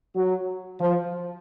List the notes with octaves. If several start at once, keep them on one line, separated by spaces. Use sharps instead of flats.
F#3
F3